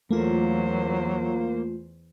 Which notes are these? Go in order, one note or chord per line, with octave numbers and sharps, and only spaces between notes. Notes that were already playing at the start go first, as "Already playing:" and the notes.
E2 F#3 A3 A#3 F4 C5